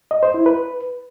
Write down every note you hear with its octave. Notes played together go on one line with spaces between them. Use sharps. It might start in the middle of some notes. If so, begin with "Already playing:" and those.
D#5
C5
E4
B4